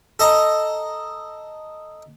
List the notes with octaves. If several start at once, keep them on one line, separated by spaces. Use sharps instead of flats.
A4 D#5 A#5